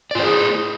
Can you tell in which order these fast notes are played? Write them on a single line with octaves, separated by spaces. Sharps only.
D5 F4 C5 G#4 E4